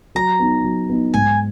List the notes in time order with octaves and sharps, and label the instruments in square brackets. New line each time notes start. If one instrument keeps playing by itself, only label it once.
[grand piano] F#3 [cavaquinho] A#5
[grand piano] B3 D#4
F#3
B3 D#4
[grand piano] G#2 [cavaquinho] G#5